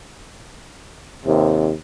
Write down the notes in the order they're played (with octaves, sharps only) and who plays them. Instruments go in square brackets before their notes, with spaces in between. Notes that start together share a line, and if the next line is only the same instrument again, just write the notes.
[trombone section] D#2 C3